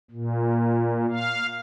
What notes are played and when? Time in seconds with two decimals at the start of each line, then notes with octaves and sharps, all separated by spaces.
0.11 A#2
1.10 F5